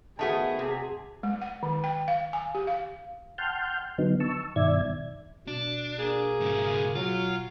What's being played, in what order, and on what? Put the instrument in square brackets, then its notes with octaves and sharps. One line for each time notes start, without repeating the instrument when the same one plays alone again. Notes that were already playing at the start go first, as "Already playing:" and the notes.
[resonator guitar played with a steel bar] D#3 A3 B3 [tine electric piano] F#4 F#5 A5 [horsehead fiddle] G#4
[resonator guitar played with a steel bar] C3
[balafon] G#3
F#5
D#3
G5
F5
G#5
G4
F5
[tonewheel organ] F#5 G5 A5 C6 F6 G6
D3 F#3 B3 D#4
A5 C#6 E6
G2 B2 D#3 D5 E5 G#6
[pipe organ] B2 [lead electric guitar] D4
[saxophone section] A#3 G#4
[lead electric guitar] G#2 C#3
[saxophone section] F#3 [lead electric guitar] F4